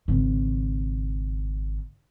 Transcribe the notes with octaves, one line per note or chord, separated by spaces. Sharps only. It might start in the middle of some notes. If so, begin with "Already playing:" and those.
G#1 C#3